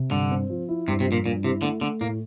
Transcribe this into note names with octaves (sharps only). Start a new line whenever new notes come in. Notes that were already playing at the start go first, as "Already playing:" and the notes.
Already playing: C3
G2 D3
C4
F3
E4
G2 C3
C3
F3
A#2
G2 A#2
C3 E4
D3 A3
D3 A3
A2 A#3